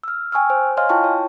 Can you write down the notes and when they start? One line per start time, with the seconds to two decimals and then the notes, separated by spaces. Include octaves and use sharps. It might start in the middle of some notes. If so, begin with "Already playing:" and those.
0.03 E6 F6
0.32 G5 G#5 C#6 E6 F6
0.50 C5
0.77 C#5 D#5 F5 G#5 C6 F6
0.89 E4 F4 G5 A5 C#6
1.04 C#5